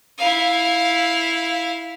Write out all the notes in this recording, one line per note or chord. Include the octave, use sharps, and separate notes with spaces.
E4 F5